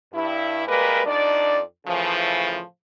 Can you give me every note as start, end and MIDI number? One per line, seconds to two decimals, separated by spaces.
0.13 0.63 43
0.13 0.63 64
0.67 1.00 55
0.67 1.00 56
0.67 1.00 58
0.67 1.00 70
0.67 1.00 71
1.06 1.60 41
1.06 1.60 62
1.06 1.60 63
1.06 1.60 74
1.86 2.61 45
1.86 2.61 49
1.86 2.61 52
1.86 2.61 53